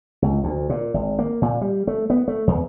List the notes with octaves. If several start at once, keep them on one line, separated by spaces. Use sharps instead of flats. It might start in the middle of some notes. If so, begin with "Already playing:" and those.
C#2
D2
A#2
G#1
A#3
A#2
G3
A3
B3
A3
E2